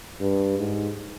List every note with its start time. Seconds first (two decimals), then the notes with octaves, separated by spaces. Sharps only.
0.20 G2
0.58 G#2